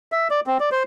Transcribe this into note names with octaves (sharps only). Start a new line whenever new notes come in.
E5
D5
C4
D5
C5